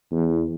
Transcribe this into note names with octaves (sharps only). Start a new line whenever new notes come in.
E2